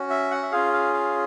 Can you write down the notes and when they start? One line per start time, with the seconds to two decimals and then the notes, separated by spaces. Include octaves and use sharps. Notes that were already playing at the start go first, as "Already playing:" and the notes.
Already playing: C#4 F#4
0.10 E5
0.31 F#5
0.43 E5
0.52 C#4 F4 G#4 F5
0.73 F5
0.93 F5